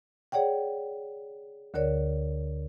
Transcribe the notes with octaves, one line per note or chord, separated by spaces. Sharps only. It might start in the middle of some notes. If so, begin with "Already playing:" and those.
G#4 C#5 D5 F#5 G5
D2 D3 A#4 C#5 D5